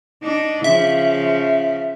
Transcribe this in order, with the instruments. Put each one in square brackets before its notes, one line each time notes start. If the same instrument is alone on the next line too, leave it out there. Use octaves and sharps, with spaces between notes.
[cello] D4 D#4
[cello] C#3 F3 [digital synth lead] E5